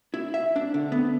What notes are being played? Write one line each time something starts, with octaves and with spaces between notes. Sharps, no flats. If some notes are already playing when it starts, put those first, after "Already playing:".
E4
E5
D4
D3
B3